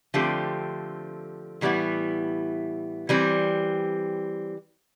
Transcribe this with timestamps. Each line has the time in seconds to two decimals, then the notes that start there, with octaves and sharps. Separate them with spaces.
0.14 D3 F3 A3 C4 G4
1.61 A2 E3 G3 B3 E4
3.09 E3 G3 C4